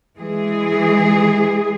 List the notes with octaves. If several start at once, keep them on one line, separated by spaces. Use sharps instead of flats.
E3 G#3 G#4